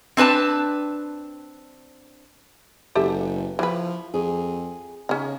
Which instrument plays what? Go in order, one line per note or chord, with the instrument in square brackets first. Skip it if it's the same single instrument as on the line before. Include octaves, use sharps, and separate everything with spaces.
[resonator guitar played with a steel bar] C4 D4 B4 A5
[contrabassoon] F#1 [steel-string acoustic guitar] B3 [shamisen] G4 A4 E5
[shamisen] E3 B4 [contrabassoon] F3
[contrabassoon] F2 [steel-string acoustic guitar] G#4
[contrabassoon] C#3 [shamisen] C#4 D#4